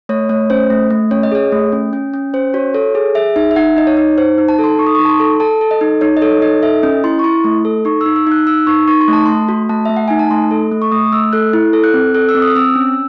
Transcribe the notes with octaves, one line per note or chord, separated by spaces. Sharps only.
A3 C#5
A3 C#5
C#4 C5
A3
A3
C#4 C#5
D#5
G#4 C#5
A3
C#4
C#4
C#4
C#4 C5
F#4 C#5
A4 C#5
G#4
G#4 E5
D#4 E5
E5
D#4 F#5
D#4 D#5
C#5
D#4
D#4 C5
D#4
A5
A4
C6
D#4 C#6
D#6
C#6
D#4
A5
C6
A4
A4 A5
A4
D#5
D#4
D#4 C#5
D#5
A4 C#5
D#4 D#5
A4 E5
C#4 D#5
E4 C6
C#6
E4 C6
A3
A4
D#4 C#6
E6
D#4
E6
D#4 F#6
D#4 E6
D#4 C#6
D#4 C#6
C6
A3 A5
A3 C6
F#4
A3 A5
A3 E5
F#5
D#4 G#5
A5
A3 C6
A4
A3
C#6
A3 D#6
A3 E6
A4 F#6
E4
A4
F#6
C4
A4 F#6
E6
C4
D#6
C4 E6
C#4